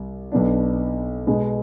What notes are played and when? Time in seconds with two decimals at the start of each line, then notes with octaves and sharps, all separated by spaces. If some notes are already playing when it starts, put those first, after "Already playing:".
Already playing: C2 G3
0.32 B1 B2 B3 D4
1.27 B2 G#3 B3